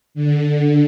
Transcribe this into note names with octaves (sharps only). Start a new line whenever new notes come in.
D3